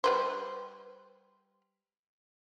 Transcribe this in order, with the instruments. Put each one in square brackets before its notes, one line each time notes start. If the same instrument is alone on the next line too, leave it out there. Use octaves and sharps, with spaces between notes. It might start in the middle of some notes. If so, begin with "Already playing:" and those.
[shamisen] G3 B4 C5